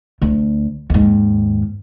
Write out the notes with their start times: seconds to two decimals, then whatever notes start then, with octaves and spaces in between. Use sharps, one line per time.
0.21 D2
0.90 D#2 G#2